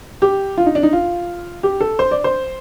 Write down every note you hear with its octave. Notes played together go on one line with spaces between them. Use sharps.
G4
F4
D#4
D4
D#4
F4
G4
A4
C5
D5
C5